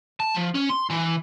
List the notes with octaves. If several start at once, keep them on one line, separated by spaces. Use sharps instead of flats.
A5
F3
C#4
C6
E3